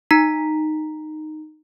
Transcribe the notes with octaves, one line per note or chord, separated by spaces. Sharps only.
D#4 A#5 B6